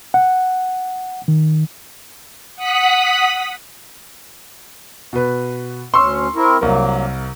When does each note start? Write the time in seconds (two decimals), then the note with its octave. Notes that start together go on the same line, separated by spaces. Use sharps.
0.14 F#5
1.28 D#3
2.56 F#5 D#6 F#6 B6
5.13 B2 B4
5.94 D2 C#4 C6 C#6 E6
6.35 C4 E4 A#4
6.61 C2 F#3 A#3 A#4